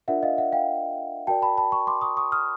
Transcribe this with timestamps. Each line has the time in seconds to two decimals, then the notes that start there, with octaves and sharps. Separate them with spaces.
0.08 D4 F4 A#4 D5 E5 F#5
0.23 D#5 F5
0.38 E5 F#5
0.52 F5 G5
1.27 F#4 A#4 D5 G5 A5
1.42 A5 B5
1.57 A5 B5
1.72 B5 C#6
1.87 C6 D6
2.02 C#6 D#6
2.17 C#6 D#6
2.32 D#6 F6